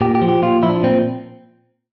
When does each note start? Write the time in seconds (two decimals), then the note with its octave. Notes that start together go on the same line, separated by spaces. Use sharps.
0.01 A#2 G4
0.15 G4
0.22 F3
0.29 G4
0.42 A#2 F4
0.63 F3 E4
0.69 D4
0.83 A#2 C4